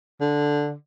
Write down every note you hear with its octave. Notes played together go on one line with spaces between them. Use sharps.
D3